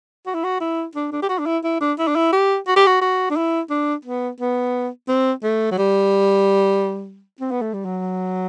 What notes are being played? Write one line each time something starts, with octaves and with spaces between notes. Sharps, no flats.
F#4
E4
F#4
E4
D4
D4
G4
F#4
D4
E4
E4
D4
E4
D4
E4
G4
F#4
G4
F#4
F#4
D4
E4
D4
B3
B3
C4
A3
F#3
G3
C4
B3
A3
G3
F#3